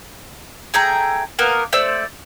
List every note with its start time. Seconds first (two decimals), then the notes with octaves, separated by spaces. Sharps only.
0.74 A3 G#4 G5 A#5
1.39 A#3 B3 A#4
1.73 A3 C5 D5 E6